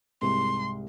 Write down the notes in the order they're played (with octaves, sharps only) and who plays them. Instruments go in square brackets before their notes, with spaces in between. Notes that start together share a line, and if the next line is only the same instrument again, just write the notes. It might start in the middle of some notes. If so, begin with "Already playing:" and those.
[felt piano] C2 G#2 [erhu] C6